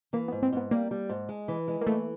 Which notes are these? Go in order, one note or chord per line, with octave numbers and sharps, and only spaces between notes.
E3 A#3
B3
G#2
C4
G#2 B3
G3 A#3
G3
G#2
G#3
E3
G#3
A#3
E3 A3